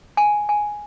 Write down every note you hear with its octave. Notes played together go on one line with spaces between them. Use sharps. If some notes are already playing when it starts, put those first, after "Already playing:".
G#5
G#5